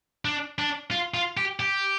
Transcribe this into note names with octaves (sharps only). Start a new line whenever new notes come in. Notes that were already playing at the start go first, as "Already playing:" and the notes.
D4
D4
F4
F4
G4
G4